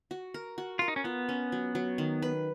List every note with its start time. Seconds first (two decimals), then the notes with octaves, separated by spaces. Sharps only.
0.11 F#4
0.34 A#4
0.58 F#4
0.79 F4 A#4
0.88 D#4
0.96 C#4
1.04 B3 F4
1.29 C#4
1.52 F#3
1.75 F#3
1.98 D#3
2.22 B4